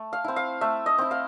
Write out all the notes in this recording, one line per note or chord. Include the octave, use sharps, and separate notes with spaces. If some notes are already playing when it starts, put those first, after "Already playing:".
Already playing: A3
F5
C4 E4
F5
A3 E5
D#5
C4 E4
F5